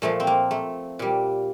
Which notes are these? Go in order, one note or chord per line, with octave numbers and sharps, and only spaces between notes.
A#2 F3 A3
C4
A#3
A3
A#2 G3